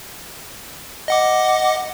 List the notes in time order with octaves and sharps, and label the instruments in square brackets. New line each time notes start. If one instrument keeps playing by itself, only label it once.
[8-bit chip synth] D#5 F#5 D6